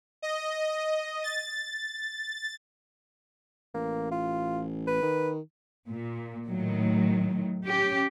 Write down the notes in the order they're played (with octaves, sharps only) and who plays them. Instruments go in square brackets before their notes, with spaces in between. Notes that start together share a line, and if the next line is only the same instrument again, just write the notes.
[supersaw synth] D#5
A6
[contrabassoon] A1 [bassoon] A#3
[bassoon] F4
B4
[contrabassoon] D#3
[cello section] A#2
A2 D#3 F#3
C#4 G4